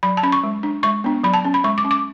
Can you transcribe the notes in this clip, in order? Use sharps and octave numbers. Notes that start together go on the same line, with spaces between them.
F#3 B5
A5
C#4 B5
C#6
G#3
D4
G#3 C#6
B3 D4
F#3 B5
A5
C#4
B5
G#3 C#6
D6
C#4
D6